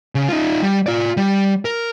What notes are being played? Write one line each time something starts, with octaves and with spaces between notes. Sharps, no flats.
C#3
D#4 F4
G3
F4 D5
G3
A#4